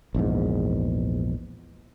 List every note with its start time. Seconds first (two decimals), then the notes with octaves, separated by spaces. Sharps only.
0.15 A#1 E2 G#2